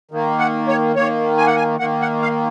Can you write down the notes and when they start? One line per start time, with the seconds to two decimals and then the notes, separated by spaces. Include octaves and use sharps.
0.11 D#3 A#3
0.39 F#5
0.68 C#5
0.95 D#3 A#3 C#5
1.37 G#5
1.47 F#5
1.57 G#5
1.79 D#3 A#3 F#5
2.01 F#5
2.22 F5